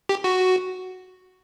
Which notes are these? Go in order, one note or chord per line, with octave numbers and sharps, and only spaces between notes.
G4
F#4